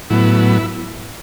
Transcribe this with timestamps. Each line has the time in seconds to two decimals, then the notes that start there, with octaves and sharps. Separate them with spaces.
0.10 A2 F#3 B3 E4